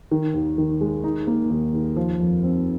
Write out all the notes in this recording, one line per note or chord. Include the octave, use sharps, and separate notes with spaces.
D#3
D#2
D#3
G#3
D#4
A#3
D#2
D#2
F3
F2
C4